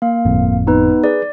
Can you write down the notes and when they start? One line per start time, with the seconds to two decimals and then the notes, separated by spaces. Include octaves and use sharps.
0.02 A#3 F5
0.25 G1 F2 A2
0.67 B3 D#4 B4
1.04 G#4 B4 D5